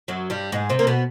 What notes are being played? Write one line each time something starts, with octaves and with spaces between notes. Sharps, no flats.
F#2 F#3
G2 G3
G#2 G#3
C3 C4
A#3
B2 B3